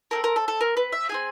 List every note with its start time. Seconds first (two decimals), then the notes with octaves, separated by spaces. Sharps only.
0.11 C4 E4 A4 A#4
0.24 A#4
0.36 A4
0.48 A4
0.61 A#4
0.77 B4
0.93 E5
1.09 C4 D#4 G#4 G#5